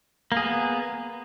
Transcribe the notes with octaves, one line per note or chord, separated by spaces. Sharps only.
A#3 B3 G#4